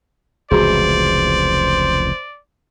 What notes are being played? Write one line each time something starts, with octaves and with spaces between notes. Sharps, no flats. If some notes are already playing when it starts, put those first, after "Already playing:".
F1 C#2 E3 F#4 G#4 C5 D5